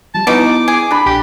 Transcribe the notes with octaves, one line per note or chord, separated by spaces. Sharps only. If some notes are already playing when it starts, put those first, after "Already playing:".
F3 G3 A5
B2 B3 D#4 E4 D6
G#4
D4 B5
A#1 G4